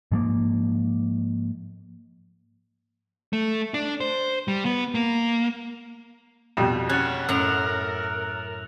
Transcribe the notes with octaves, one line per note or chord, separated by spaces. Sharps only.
G#2 F3 A#3
A3
D4
C5
G3
B3
A#3
F2 B2 G3 E7
C#4 G#4 F#5 F#6 A6 C#7
F#2 A2 A#4 F#5 E6 F7